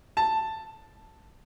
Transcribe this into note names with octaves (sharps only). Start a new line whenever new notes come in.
A5